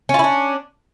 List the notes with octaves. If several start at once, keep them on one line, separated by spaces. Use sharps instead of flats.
C#4 D4 E4 F4